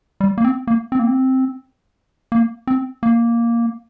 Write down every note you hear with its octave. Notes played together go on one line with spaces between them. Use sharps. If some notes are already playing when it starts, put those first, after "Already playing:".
G3
A#3
C4
A#3
C4
A#3
C4
A#3
C4
A#3